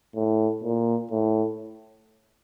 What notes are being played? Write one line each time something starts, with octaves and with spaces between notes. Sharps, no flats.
A2
A#2
A2